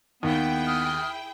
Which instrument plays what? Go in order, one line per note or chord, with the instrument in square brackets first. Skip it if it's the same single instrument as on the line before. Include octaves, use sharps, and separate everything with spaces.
[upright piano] D#2 [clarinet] B3 [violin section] E4 G#4 G5
[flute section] D#6 F6